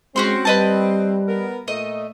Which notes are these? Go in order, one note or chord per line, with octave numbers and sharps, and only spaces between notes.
G#3 C4 C#4 F#4 C6
G3 B4 D#5 A5
B3 A#4
A#2 A3 D#5